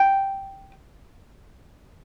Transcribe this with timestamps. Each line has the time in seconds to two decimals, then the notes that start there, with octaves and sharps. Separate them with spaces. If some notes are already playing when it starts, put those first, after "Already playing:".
Already playing: G5